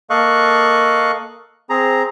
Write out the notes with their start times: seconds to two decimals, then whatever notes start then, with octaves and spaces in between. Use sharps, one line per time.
0.10 A#3 A4 D#5 F5 C#6 F#6
1.70 C4 G#4 A#5